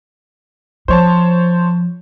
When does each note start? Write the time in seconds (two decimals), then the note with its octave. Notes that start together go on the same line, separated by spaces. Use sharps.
0.88 F3 C5 C#5 A5